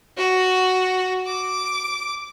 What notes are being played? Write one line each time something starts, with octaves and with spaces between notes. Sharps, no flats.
F#4
D6